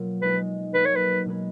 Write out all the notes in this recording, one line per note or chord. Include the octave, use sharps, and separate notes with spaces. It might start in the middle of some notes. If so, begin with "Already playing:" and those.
Already playing: B2 F#3 A#3 F4
G#3 D#4 F#4 B4
F#3 A#3 D#4 B4
C#5
B4
B2 G#3 D#4 G#4 B4